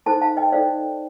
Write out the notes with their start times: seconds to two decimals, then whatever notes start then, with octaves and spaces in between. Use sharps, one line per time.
0.06 D#4 A4 C5 A5 C6
0.21 F5 A5
0.37 D#5 G5
0.52 D#4 A4 C5 D5 F5